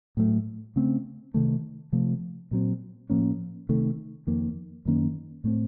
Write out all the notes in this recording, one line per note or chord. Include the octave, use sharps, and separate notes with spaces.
A2 F#3 A3
C#3 A3 C4
C3 D#3 A3
C3 F3 A3
A#2 F#3 C4
A2 F3 A#3 C#4
C3 D#3 A3
F2 D#3 A#3
F#2 D#3 A#3 C#4
A2 A3 C4